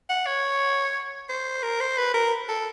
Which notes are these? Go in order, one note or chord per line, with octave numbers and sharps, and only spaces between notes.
F#5
C#5
C5
A#4
C5
B4
A#4
A4